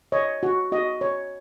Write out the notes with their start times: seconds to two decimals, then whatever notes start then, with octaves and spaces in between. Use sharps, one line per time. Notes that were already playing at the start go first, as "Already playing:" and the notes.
0.12 C#5 D#5
0.43 F#4
0.72 F#4 D#5
1.01 C#5